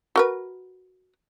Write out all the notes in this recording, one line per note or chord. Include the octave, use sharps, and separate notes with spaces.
F#4 A#4 B4